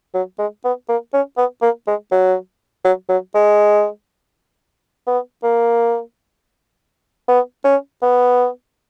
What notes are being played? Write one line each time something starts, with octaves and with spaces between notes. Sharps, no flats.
F#3
G#3
B3
A#3
C#4
B3
A#3
G#3
F#3
F#3
F#3
G#3
B3
A#3
B3
C#4
B3